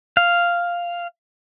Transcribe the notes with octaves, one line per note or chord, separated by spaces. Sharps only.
F5